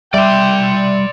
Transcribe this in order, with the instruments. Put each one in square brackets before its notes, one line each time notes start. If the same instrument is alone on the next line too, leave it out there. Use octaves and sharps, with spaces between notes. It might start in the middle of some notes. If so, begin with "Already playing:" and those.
[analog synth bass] G3 [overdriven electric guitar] D5 C6 [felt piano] E5 D6 [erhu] G5